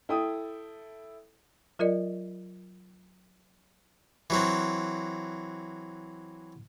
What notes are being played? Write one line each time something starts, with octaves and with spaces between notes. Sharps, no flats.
E4 A4 G5 D#6
F#3 F4 A#4 D5 D#5
E3 F#3 C4